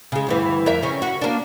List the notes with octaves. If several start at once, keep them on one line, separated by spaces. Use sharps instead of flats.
C#3 G#3
D2 G2 E3
F2 A#4 E5
C#3 C4 C#4
F#4
A#3 D4